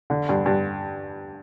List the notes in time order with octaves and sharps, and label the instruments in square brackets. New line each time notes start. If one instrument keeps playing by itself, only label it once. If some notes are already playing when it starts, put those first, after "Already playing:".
[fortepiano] D3
G2
G2